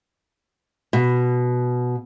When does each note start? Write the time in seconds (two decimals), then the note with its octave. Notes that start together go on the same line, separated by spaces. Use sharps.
0.93 B2